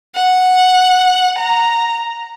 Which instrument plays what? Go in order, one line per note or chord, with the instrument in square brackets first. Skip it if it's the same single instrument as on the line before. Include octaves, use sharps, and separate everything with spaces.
[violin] F#5
A#5